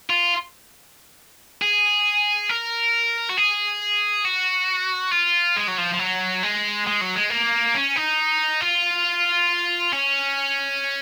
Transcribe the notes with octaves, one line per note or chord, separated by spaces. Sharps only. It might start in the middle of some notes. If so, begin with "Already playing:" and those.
F4
G#4
A#4
F#4
G#4
F#4
F4
G#3
F#3
F3
F3
F#3
G#3
G#3
F#3
G#3
A#3
C#4
D#4
F4
C#4